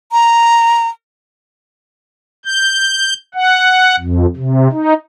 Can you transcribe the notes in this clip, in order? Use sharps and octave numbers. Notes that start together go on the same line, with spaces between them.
A#5
G6
F#5
F2
C3
D#4